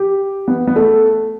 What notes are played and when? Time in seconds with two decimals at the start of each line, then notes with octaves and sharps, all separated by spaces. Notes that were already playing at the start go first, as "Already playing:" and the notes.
Already playing: G4
0.48 B3
0.67 B3
0.76 A3